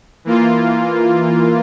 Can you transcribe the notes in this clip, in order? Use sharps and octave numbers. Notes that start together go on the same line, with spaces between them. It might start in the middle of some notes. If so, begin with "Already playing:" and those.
E3 A#3 F4